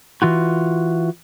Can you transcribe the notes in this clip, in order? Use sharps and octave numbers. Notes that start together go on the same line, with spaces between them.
E3 F4 F#4